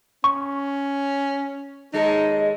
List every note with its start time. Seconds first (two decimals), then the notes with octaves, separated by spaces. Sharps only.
0.24 C#4 C#6
1.94 D#2 G#3 D#4 A4 D#5